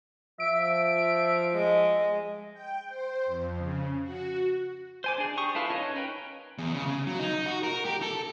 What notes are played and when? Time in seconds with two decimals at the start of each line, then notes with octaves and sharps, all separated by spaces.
0.40 F3 E5 D7
1.53 G#3
2.53 G5
2.88 C5
3.26 F2
3.56 C#3
4.03 F#4
5.04 C5 G#5 D6
5.18 D4 G#4
5.37 G4 C#6 D#6
5.55 E4 F4 A4 B4 F5
5.70 C#4 D#4 B4 C#5 D#5
5.96 A#4 B4 G5
6.58 E2
6.73 C#3
6.86 C#3
7.07 F#3
7.19 D#4
7.46 F#4
7.63 A#4
7.85 G4
8.02 A4